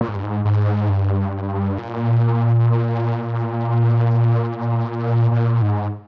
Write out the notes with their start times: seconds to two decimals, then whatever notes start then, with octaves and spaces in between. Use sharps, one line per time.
0.01 A#2
0.08 G#2
0.16 G2
0.23 G#2
0.45 G#2
0.89 G2
1.78 A#2
5.32 A#2
5.62 G#2